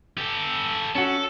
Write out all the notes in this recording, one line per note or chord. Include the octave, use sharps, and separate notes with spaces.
G4 A4
C#4 F#4 A4